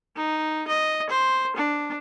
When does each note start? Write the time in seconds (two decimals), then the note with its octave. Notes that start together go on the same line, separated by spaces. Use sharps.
0.17 D#4
0.68 D#5
1.10 C5
1.57 D4